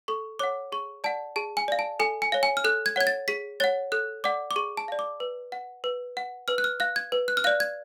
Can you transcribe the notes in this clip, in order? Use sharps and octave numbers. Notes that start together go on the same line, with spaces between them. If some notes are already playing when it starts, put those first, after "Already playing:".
A4 C#6
C#5 F#5 D6
G#4 C#6
D5 F#5 A5
G#4 A5
G#5
D5 F5
A5
A4 G#5
G#5
C#5 F5
G#5
F6
A4 F#6
G#6
C#5 F#5 G#6
A6
G#4 B6
C#5 F#5 A6
A4 F#6
D5 F#5 D6
D6
G#4 C#6
A5
D5 F5
D6
B4
F#5
B4
F#5
B4 F6
F#6
F6
F5 F#6
G#6
B4
F#6
F6
D5 F5 F#6
G#6